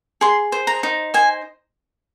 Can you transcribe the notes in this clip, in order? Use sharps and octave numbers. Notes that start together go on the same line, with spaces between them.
G#4 C6
C5
A#5
D#4
C5 G#5